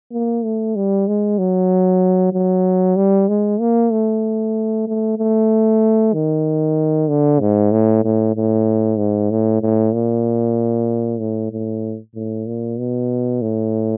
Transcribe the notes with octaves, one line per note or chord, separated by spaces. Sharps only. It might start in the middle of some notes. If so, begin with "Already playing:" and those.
A#3
A3
G3
G#3
F#3
F#3
G3
G#3
A#3
A3
A3
A3
D#3
D3
G#2
A2
A2
A2
G#2
A2
A2
A#2
A2
A2
A2
A#2
B2
A2